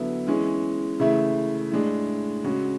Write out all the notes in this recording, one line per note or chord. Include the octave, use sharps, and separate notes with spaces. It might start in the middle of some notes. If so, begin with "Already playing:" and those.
Already playing: D3 F#3 B3 E4 A4
E3 G#3 C#4
C#3 E3 A3 E4
A2 G#3 D4
C#3 G#3 C#4 F#4